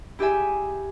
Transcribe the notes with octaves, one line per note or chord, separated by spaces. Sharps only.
E4 G4 G#4 E5 G#5